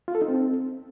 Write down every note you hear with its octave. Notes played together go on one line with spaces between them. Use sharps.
F4
A4
D#4
C4